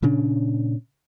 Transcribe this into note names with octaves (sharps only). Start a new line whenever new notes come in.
A#2 C#3 C#4 D4